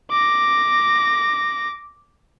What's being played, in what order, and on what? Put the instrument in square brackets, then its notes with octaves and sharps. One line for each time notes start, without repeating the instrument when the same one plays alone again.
[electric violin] D6 A#6